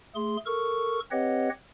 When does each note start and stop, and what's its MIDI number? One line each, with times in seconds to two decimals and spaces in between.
0.15 0.37 57
0.15 0.37 68
0.15 0.37 84
0.46 1.00 69
0.46 1.00 70
0.46 1.00 85
0.46 1.00 89
1.11 1.49 60
1.11 1.49 67
1.11 1.49 71
1.11 1.49 73
1.11 1.49 75
1.11 1.49 78